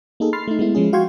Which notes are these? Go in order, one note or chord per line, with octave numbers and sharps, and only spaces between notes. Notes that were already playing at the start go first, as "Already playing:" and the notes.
A#3 D#4 G#4 A4
B5 C6 F6 A6 C7
A3 D#4
G#3 A3 B3 E4
F3 G#3 C#4 G#4
F#4 F5 G5 C6 C#6 G#6